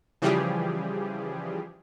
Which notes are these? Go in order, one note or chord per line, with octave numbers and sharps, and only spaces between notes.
C#3 E3 F3 G3 G4 G#4